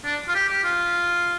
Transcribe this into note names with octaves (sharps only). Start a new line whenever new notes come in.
D4
F4
G4
G4
F4